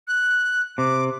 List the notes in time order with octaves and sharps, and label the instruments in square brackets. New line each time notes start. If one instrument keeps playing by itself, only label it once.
[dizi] F#6
[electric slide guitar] C3 [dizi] D6